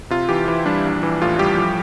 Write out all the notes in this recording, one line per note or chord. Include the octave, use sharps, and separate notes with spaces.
C3 F4
E3 G4
E3 E4
G3 D4
A#1
E3
A2 F4
G3 G4
F3